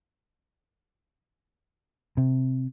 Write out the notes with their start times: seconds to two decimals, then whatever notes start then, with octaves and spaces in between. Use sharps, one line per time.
2.17 C3